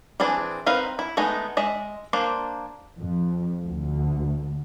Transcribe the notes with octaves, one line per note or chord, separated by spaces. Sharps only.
E3 C4 D4 G#4
C4 D#4 A#4 B4 F5
E4
G#3 A3 B3 D#4
G#3 D#5 E5
A#3 D4 C5
F2
D2